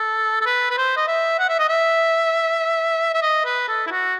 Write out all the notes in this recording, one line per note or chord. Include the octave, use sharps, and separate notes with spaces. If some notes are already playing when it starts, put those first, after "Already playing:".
Already playing: A4
A4
B4
B4
C5
D#5
E5
F#5
E5
D#5
E5
E5
D#5
B4
A4
E4
F#4